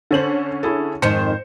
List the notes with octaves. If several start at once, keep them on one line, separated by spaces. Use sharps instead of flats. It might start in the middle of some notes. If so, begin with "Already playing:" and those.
D3 C#4 A4 C5 F#7
E4 G#4 A4
F2 G#2 D#3 C5 C#7